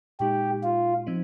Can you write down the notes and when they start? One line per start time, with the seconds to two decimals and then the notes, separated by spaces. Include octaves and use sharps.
0.20 A#2 G#3 D#4 G4
0.64 F4
1.07 F3 C4 D#4